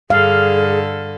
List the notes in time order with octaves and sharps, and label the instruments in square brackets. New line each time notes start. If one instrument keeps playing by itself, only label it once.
[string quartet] G2 D3 A4 [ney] G#4 [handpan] F5